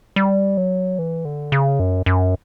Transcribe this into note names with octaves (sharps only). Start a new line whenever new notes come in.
G3
F#3
E3
D3
C#3
F#2
F#2